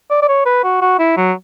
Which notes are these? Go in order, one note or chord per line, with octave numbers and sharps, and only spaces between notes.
D5
D5
C#5
B4
F#4
F#4
E4
F#3